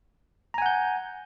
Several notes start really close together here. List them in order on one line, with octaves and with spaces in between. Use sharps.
A#5 G#5 F#5 G6